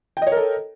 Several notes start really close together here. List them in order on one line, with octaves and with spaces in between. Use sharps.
G5 D#5 C#5 A#4 A4